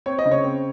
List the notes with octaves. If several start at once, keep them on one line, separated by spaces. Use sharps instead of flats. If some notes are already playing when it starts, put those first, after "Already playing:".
C4 C#5
D#5
C#3
C#5
C4